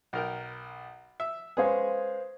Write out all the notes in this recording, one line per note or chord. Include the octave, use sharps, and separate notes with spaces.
B1 A#4 G5
E5
G#3 C#4 G#4 B4 C5 F5